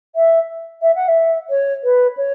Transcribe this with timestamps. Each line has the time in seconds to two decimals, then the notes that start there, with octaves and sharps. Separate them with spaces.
0.15 E5
0.82 E5
0.95 F#5
1.08 E5
1.50 C#5
1.83 B4
2.17 C#5